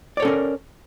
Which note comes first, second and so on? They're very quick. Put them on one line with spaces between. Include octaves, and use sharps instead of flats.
D5 C#5 A4 C#4 A#4